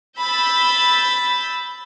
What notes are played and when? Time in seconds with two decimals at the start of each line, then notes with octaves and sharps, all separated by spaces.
0.19 B5 E6 G6 A6